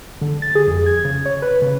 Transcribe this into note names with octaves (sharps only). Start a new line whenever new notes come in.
D3
A6
G#4
F2
G#6
C#3
C#5
B4
C#3